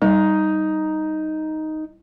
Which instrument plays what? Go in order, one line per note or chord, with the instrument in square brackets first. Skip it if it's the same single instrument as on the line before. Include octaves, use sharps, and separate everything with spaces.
[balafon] G3 [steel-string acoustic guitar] D#4